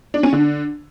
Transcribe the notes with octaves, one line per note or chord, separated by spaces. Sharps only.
D4
C#4
D3